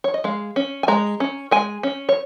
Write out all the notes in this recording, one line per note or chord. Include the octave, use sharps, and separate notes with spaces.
C#5
D#5
G#3 F5
C#4
G#5
G#3 A#5
C#4
G#3 G#5
C#4
C#5